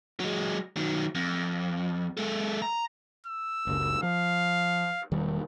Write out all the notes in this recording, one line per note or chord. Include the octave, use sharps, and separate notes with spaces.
F#3 G#3
D#3 F#3
F2
G#3 A4
A#5
E6
F#1 C#2
F3 F5
E1 D#3 G3